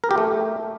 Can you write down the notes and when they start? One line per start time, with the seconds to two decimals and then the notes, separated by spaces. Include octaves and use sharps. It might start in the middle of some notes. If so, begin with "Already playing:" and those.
0.04 A#4
0.11 G4
0.18 A3